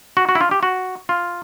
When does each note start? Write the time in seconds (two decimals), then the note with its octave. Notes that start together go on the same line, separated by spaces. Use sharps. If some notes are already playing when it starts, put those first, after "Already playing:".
0.17 F#4
0.29 F#4
0.35 E4
0.41 F4
0.51 G4
0.63 F#4
1.09 F4